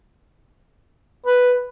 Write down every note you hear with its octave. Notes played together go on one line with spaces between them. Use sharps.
B4